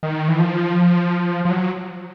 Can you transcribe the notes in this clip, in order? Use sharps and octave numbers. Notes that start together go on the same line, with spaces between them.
D#3
E3
F3
F3
F#3